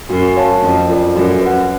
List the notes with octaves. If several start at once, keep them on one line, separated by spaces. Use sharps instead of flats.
F#2 F#4
C#5 F5 A5
F2 C#4
F4 A4 D5
F#2 F#4
B4 F#5